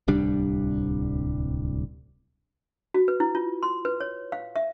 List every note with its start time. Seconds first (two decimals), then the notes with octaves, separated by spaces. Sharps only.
0.08 D1 C2 G3 D4
2.94 F#4
3.08 B4
3.20 E4
3.35 F4
3.63 C6
3.85 B4
4.00 C#5
4.32 F5
4.56 E5